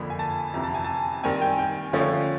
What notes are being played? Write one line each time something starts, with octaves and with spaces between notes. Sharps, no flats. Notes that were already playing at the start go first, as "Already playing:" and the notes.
Already playing: F2 D3 F3 A#3 B5
G#5
A5
F2 C3 E3 A#5
A5
G#5
A5
D#3 G3 C4 G#5
G5
G5
D3 F3 A3 C#4 F4